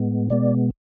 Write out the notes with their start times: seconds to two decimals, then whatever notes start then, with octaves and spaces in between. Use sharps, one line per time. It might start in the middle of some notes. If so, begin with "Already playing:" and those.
Already playing: A2 G#3 B3
0.30 B2 G#3 B3 D5